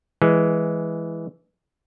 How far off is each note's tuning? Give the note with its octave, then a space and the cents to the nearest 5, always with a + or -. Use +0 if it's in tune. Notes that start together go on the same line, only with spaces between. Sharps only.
E3 +0 G#3 +0